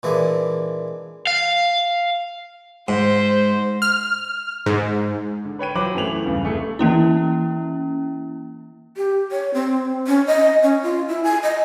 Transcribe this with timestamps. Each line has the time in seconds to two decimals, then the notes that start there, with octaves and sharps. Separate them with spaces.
0.03 A#2 E3 G#3 D4
1.27 F5
2.88 G#2 C5
3.82 F6
4.66 G#2
5.45 D3
5.59 B4 C#5 G5 D#7
5.75 F#3 F4 B4 C5 D6 F#7
5.95 F#2 E3 A3 F7 F#7
6.25 E2 G2 C#3
6.44 F1 A3 G#4 C#7
6.79 E3 A#3 C#4 E4
8.97 G4
9.31 C#5
9.54 C4
10.07 C#4
10.27 D#5
10.63 C#4
10.83 F4
11.08 E4
11.24 G#5
11.43 D#5